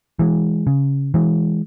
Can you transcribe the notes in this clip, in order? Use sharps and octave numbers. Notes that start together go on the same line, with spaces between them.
E3 G#3
C#3
E3 G#3